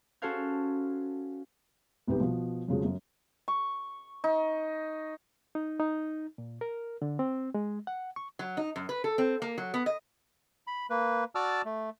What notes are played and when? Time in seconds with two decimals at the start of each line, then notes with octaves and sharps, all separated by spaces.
0.22 C#4 F#4 A4 C5 F5 G#6
2.07 C2 G#2 D#3 B3 G4 B4
2.20 B2 F3
2.68 F2 C#3 F3 F#3 G#3
2.84 F#2
3.48 C#6
4.24 D#4
5.55 D#4
5.80 D#4
6.38 A#2
6.61 A#4
7.02 D3
7.19 C4
7.54 G#3
7.87 F#5
8.16 C#6
8.39 F#3
8.57 D#4
8.76 F#2
8.89 B4
9.04 A4
9.18 C4
9.42 A#3
9.58 F#3
9.74 B3
9.86 D#5
10.67 B5
10.90 A#3 B4
11.35 F#4 D5 A5 D6 E6 F6
11.65 A3